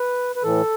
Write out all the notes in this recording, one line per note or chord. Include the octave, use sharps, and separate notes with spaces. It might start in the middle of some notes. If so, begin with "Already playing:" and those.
Already playing: B4
B4
A2 E3 A4